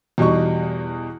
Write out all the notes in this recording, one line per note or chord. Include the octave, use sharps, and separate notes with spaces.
E2 B2 G3 D#4 C#6